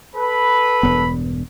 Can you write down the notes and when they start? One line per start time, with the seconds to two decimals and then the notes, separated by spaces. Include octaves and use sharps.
0.15 A4 B4 B5
0.83 E1 G2 B3